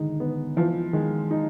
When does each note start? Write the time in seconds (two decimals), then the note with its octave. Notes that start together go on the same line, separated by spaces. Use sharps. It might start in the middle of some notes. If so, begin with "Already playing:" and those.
Already playing: D3 D#3 G#3 D#4
0.20 B3
0.57 E3 F3
0.93 D#3 G#3
1.31 D#4